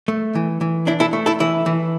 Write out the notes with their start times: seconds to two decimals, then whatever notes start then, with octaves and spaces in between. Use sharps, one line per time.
0.08 A3
0.35 E3
0.61 E3
0.87 D4 E4
1.00 E4 A4
1.13 A3
1.26 E4 A4
1.40 E3 E4
1.66 E3